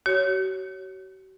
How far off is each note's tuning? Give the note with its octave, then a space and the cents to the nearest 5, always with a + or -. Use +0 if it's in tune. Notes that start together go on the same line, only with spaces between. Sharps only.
F#4 +45 C#5 +0